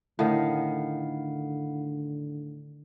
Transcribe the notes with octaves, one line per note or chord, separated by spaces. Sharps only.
A2 D3 D#3 E4 F5 F#5